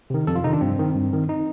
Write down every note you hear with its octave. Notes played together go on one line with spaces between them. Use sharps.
C3 D#3
F2 A4
F4
C3 D#3 D#4
D4
G2 C4
D#3
G2
D#3
D#4